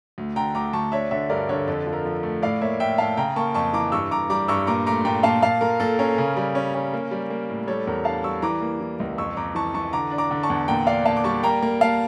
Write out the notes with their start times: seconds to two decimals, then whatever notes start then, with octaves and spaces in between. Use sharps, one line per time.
0.18 D2
0.36 D3 G5 A#5
0.55 D2 A#5 D6
0.73 D2 A5 C#6
0.92 D4 C#5 E5
1.11 D3 C#5 E5
1.30 G2 A#4 D5
1.49 D3 A4 C#5
1.67 F2 A4
1.87 F3
1.93 A#4
2.05 F3
2.23 A3
2.42 A2 D5 F5
2.62 A#3 C#5 E5
2.79 A2 E5 G5
2.98 A2 F5 A5
3.17 C#3 G5 A#5
3.36 A#3 A5 C#6
3.54 F2 A5 C#6
3.73 E3 A#5 D6
3.92 G2 C#6 E6
4.11 G2 A#5 D6
4.30 G3 A#5 D6
4.48 G2 C#6 E6
4.67 A#2 A#5 D6
4.87 A3 A#5 D6
5.05 A#2 G5 A#5
5.23 A#2 F5 A5
5.43 A#2 F5 A5
5.61 A#2 A#4
5.80 A#2 A4
5.99 C#4 A#4
6.18 C#3
6.37 G3
6.55 C#4
6.75 C#4
6.93 A#3
7.11 G3
7.30 A#3
7.50 A2
7.67 G3 A4 C#5
7.87 E2 A#4
8.05 D4 F5 A5
8.24 G3 C#6 E6
8.42 E3 A#5 D6
8.61 A#3
8.81 E3
9.00 C#2
9.18 F2 C#6 E6
9.37 F2 A#5 D6
9.55 E3 A5 C#6
9.74 E3 A5 C#6
9.93 D3 A#5 D6
10.11 D4
10.18 A#5 D6
10.31 D3
10.43 A5 C#6
10.50 E2
10.68 A#2 G5 A#5
10.87 D4 D5 F5
11.05 A#2 F5 A5
11.17 D6
11.24 G3 A5 C#6
11.43 A#3 G5 A#5
11.62 A#3
11.81 A#3 F5 A5